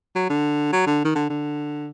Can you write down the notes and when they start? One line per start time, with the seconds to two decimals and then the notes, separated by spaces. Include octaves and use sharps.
0.15 F#3
0.30 D3
0.73 F#3
0.86 D3
1.05 D#3
1.15 D3
1.30 D3